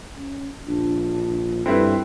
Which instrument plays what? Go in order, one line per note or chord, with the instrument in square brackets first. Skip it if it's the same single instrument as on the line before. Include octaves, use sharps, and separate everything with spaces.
[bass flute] C#4
[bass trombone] A#1 [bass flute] D4
[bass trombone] G2 [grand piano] C4 E4 B4 [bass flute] A4